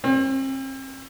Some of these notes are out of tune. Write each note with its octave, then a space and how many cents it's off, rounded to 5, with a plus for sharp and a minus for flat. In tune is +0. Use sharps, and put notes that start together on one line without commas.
C4 +40